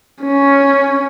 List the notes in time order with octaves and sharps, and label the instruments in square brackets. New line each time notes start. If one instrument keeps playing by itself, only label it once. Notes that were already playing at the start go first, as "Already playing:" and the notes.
[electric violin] C#4